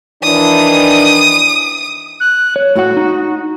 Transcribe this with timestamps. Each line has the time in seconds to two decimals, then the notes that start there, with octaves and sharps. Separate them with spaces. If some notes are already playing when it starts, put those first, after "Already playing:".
0.23 D#3 E3 D4 D#6
2.20 F#6
2.56 C#5
2.76 A2 F#4 F#5
2.97 D#4